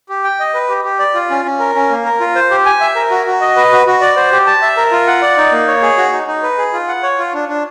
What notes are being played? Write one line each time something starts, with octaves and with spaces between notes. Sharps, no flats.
G4
G5
D#5
B4
G4
G4
D5
F4
C#4
C#4
A#4
C#4
A#3
A#4
F4
C5
G4
G#5
E5
A#4
F#4
F#4
D#5
B4
F#4
F#4
D5
C5
G4
A5
E5
A#4
F4
F#5
D5
D#4
A#3
C#5
G#4
F#4
D#4
D#4
B4
G#4
F4
F#5
C#5
F4
D4
D4